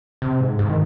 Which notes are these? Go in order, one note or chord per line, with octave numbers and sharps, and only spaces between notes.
C3
G#2
G#2
D#3